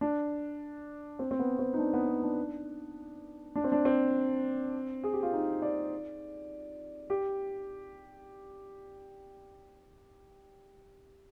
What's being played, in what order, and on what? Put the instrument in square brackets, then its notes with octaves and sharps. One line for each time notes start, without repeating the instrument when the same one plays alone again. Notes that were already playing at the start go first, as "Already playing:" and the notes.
[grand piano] D4
C4
C4
B3
C4
D#4
D4
B3
C4
D4
D4
C4
D4
C4
G#4
G4
F4
D#4
D5
G4